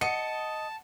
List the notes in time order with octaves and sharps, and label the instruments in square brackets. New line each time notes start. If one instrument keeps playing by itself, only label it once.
[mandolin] D#5 [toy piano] F#5 [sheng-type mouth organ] A5 [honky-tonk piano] C#7